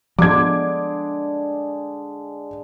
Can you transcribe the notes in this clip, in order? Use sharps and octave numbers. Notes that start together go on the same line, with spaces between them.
D3 F3 G#3 B3 D4 D6 G#6